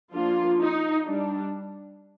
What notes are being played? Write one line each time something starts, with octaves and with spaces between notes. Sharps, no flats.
F3 A#3 D4 F4
D#4
G3 D4